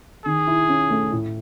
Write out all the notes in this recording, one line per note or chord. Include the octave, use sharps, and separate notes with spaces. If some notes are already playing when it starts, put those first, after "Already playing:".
D#3 G#4
E4
C#4
A3
A2